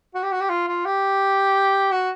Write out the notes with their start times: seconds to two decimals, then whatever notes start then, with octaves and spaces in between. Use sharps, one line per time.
0.15 F#4
0.23 G4
0.32 F#4
0.41 G4
0.50 F4
0.68 F4
0.85 G4
1.92 F#4